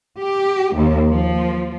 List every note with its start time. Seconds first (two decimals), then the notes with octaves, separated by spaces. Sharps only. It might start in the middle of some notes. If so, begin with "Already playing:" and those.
0.19 G4
0.75 D#2
1.09 F3